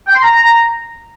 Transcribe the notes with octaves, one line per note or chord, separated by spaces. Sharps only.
G5
C6
A#5